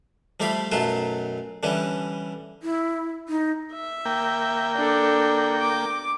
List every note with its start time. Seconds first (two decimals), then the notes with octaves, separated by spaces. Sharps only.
0.40 F3 G3 A3 D5 F5 B5
0.71 B1 F#2 F#3 A3 F4 A5
1.63 D3 E3 G3 C#4
2.62 E4
3.29 D#4
3.73 E5
4.05 A#3 G5
4.76 D4 A4
5.61 D6